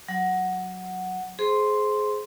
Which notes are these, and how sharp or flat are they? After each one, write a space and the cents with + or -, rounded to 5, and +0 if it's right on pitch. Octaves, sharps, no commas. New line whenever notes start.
F#3 +0 F#5 +0
G#4 +20 C5 +0 C6 +0